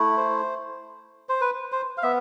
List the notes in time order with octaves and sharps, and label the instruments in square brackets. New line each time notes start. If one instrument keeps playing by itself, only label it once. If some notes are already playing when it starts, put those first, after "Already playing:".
Already playing: [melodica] A3 E4
C5
C5
B4
C5
F5
B3 E5